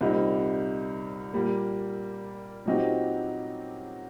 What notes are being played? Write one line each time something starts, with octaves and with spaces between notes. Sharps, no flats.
C2 A#2 G3 C4 D#4
A#2 G3 A#3
A#2 F#3 C4 D#4 G4